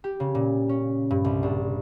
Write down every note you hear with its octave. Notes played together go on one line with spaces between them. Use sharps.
G4
C#3
A#2
C#4
G2
C2
A#1